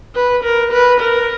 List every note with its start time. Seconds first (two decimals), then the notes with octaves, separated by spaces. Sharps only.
0.15 B4
0.44 A#4
0.72 B4
1.01 A#4